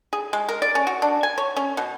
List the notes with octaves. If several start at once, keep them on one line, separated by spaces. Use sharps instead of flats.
G#4
G#3
A#4
D5
C#4
F#4
D4
G#5
C#5
C#4
B2